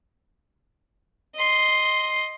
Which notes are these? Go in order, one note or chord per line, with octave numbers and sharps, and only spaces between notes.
D#5 C6